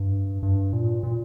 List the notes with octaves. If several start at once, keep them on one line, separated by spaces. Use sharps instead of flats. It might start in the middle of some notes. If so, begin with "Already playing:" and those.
Already playing: G2
G2
A#2
A#2